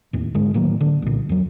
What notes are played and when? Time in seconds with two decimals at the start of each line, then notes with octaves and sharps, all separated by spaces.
0.13 D#2 A2
0.35 G#1 G#2 D3 G#3
0.54 A2 D#3 F#3 A#3
0.81 D3
1.02 C2 A#2
1.29 F2 F#3